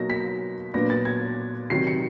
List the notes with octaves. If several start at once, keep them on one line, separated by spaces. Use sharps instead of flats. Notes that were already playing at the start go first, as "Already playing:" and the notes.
Already playing: B2 F#3 A#3 D#4 A#6
B6
A#2 F#3 B3 D4 A#6
A6
G#6
C3 D#3 F#3 C7
C#7